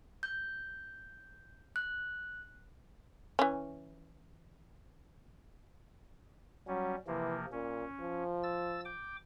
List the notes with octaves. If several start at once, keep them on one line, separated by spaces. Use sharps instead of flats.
G6
F#6
E3 C#4
F#3 G3 C#4
C3 E3 F3 A#3
A#2 C#4
F3
E6 A6
G5 D6